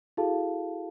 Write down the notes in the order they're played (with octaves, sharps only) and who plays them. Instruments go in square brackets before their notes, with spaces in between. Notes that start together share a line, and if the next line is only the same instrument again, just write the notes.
[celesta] E4 F#4 G#4 A4 F5 A5